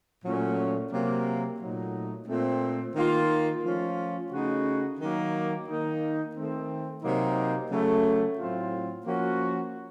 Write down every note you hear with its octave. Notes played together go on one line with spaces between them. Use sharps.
A#2 F#3 A3 C#4
C3 F#3 A#3
A#2 F#3 A3 D#4
A#2 A3 C4
D#3 A#3 F4
F3 A3 C#4 F4
C#3 A3 D#4 F#4
D#3 F#3 A#3
D#3 A#3 D#4
D#3 A3 C4
C3 F#3 A#3 D#4
C#3 F#3 A3
A2 F#3 C4 F4
F3 A#3 C#4 F#4